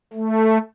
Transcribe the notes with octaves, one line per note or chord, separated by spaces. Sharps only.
A3